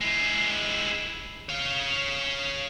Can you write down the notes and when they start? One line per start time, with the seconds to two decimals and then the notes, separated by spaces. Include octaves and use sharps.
0.01 G#3 E4
1.49 C#5 F5